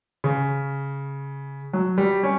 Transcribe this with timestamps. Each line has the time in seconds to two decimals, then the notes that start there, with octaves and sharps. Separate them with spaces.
0.24 C#3
1.73 F#3
1.98 G3
2.23 C#4